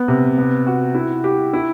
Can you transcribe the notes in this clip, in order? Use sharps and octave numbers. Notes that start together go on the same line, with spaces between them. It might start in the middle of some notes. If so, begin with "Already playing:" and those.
Already playing: B3
C3
B3
F#4
E4
G4
E4